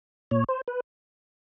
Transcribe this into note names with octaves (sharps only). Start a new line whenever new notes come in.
A#2 C#5
C5
B4